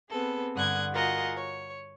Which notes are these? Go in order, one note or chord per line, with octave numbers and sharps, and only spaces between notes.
B3 C4 G#4 A4 B4
G2 D3 F#5 D#6 F#6 G#6
F4 F#4 G#4 A#4 D#5 F#5
C#5